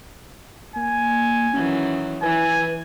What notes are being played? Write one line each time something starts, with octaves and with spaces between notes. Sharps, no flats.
A#3 G#5
D#3 E3 F#3 C#4
E3 B4 G#5